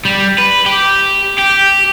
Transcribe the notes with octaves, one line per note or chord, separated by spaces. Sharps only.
G3
B4
G4
G4